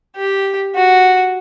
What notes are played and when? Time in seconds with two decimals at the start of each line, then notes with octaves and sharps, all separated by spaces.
0.16 G4
0.75 F#4